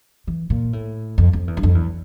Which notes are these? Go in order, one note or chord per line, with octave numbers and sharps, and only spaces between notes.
E3
A#2
A2
F2
F2
E2
G2
F2
E2